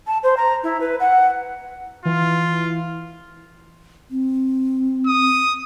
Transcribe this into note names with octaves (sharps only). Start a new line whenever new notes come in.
A5
C5
A#5
E4
B4
F#5
E3 F4
C4
D#6